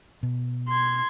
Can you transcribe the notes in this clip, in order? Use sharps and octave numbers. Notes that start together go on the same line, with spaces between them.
B2
C6 G#6